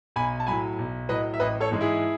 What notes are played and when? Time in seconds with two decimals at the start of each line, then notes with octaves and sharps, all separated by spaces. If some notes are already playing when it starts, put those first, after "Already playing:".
0.16 B1 G#5 B5
0.40 A5
0.47 A2 F#3 G#5 B5
0.79 B1
1.09 A2 F#3 B4 D#5
1.34 E5
1.40 A1 B4 D#5
1.60 A4 C#5
1.71 G#2 E3 G#3
1.81 E4 G#4